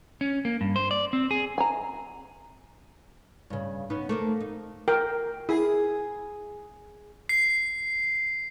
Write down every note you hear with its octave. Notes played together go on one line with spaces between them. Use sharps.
C#4
A#3
G2
C5
D5
C4
G#4
G#5 A#5
G2 C#3
B3 C#4 D#4
A3 A#3 C4
D#4
A#4 G5
E4 G#4
C7